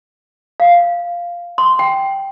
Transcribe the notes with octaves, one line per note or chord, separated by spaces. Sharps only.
F5
C6
G5